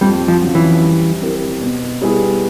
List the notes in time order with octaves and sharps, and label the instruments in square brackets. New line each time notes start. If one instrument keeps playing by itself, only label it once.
[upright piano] F2 [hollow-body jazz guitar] G3
[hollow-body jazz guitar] F3
[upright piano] C#3 F#3
[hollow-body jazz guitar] E3
[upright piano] G3
C4 E4 G4 A#4
B2
G3 B3 E4 G#4